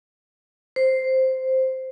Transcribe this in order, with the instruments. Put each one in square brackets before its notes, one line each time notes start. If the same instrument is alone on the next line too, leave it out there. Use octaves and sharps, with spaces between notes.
[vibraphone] C5